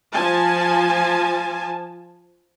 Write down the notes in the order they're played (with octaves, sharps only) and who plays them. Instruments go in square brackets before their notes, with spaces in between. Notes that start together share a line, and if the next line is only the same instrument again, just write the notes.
[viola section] F3 G#5 A5